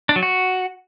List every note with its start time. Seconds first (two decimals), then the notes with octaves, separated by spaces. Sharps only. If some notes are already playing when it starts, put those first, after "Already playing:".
0.09 D4
0.16 F#3
0.23 F#4